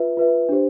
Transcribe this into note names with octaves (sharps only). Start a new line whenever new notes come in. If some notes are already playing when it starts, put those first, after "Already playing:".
Already playing: F4 B4 E5
F4 B4 E5
D4 G4 C5